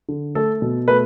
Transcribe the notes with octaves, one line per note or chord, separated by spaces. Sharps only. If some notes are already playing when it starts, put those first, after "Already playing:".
D3
A3 A4
B2
A3 B4